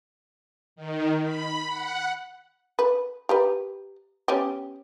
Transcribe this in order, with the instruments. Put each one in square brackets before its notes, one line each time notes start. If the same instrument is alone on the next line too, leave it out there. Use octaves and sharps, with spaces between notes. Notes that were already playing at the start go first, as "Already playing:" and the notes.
[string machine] D#3
B5
F#5
[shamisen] B4
G4 A#4 B4
B3 C#4 G4